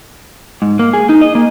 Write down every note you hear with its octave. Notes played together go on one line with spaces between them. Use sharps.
G#2
A#3
G#4
D#4
D#5
A#3